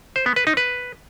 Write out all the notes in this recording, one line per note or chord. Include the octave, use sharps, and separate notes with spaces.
C5
B3
B4
D#4
B4